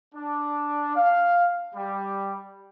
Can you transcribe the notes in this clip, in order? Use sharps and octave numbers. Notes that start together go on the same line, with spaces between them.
D4
F5
G3